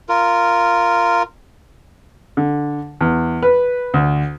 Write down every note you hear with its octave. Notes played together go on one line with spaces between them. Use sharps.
F4 A#4
D3
E2
B4
D2